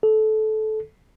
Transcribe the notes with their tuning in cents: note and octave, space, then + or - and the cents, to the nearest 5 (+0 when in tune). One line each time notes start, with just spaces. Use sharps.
A4 -20